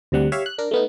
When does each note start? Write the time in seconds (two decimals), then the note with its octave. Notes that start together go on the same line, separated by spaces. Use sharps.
0.12 D2 C3 G3 F#5
0.32 G4 C#5 E5 F5
0.46 F#6
0.58 D4 A#4
0.71 A3 B3 D#4